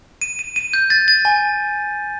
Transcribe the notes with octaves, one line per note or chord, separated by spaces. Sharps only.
D#7
D#7
D#7
G6
A6
A6
G#5